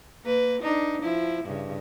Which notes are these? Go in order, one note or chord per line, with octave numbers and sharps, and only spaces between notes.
A#3 B4
D4 D#4
F3 E4
G2 C#3